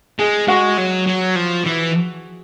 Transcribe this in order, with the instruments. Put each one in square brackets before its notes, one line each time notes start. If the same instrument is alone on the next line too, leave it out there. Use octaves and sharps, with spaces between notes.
[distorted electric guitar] G#3 [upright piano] G#4
[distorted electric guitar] G#3 [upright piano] F#4
[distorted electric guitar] F#3
F#3
F3
E3